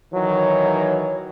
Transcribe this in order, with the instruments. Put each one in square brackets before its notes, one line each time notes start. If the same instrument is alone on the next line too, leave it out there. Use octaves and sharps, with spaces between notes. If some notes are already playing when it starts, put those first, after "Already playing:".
[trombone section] D#3 E3 F#3 [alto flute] C#5